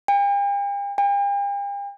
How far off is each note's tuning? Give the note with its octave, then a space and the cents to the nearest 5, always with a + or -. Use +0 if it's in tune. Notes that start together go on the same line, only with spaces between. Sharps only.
G5 +45
G5 +45